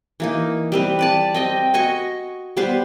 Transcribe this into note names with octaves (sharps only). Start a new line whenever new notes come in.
E3 A#3 D#4
G3 C4 B4
B4 D5 A5
C4 D#5 G5
F#4 D#5 G#5 C#6
G3 B3 B4 C5